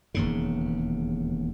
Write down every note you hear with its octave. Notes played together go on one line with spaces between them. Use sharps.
E1 D#2 C#3